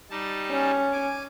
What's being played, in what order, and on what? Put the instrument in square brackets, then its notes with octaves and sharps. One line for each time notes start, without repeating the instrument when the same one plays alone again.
[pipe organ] G3 D#4 A5
[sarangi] C#4
[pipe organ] G#5 D6